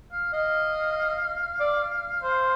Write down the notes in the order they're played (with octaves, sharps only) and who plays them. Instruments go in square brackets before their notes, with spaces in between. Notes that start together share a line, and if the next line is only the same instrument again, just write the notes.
[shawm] F5
[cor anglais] D#5 [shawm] F5
[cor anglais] D5
C5